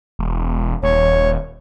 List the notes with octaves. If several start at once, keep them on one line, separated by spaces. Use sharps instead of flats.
E1
D#1 C#5